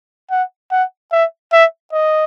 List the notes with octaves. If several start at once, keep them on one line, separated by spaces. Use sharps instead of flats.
F#5
F#5
E5
E5
D#5